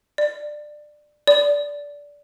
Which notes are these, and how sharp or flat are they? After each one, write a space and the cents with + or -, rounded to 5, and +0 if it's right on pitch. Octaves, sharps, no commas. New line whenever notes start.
D5 +20
D5 -15